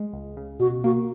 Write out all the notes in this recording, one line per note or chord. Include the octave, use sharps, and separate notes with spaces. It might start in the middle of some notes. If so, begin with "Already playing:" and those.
Already playing: G#3
C#2
C#3
B2 F#4
A#3 F#4